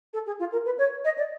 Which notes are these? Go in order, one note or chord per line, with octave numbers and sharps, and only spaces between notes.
A4
G#4
F4
A#4
B4
C#5
D#5
D5